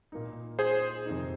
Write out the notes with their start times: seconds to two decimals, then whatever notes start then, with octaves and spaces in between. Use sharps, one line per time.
0.12 A#2 A#3 D#4
0.59 G#4 C5
1.06 F2 C3 D#3 C4 D#4